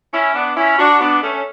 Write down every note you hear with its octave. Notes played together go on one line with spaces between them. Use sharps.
C#4 E4
B3 D4
C#4 E4
D4 F#4
B3 D4
A3 C#4